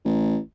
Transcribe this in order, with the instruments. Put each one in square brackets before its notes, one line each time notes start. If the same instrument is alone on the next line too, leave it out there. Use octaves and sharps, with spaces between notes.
[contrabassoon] A1